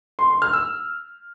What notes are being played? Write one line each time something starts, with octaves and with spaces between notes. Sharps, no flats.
C6
C6
F6
E6